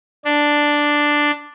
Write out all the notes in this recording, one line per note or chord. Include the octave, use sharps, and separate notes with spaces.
D4